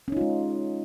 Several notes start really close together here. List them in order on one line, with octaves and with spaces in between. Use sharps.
C#4 D#4 F4 G#3